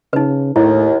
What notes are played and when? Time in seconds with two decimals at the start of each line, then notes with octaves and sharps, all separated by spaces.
0.13 C#3 D#4 B4
0.56 D#2 A2 E4